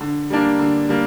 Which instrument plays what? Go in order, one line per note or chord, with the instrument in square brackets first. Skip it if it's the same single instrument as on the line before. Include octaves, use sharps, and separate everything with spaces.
[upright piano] D3
G3 A#3 D4
D3
G3 A#3